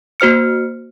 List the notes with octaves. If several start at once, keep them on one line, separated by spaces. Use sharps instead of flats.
A#3 F#4 C5 F6 C#7